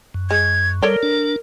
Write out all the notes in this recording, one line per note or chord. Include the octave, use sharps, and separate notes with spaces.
F#2
G#3 G#6
G3 A4 A#4 C#5 D5
D4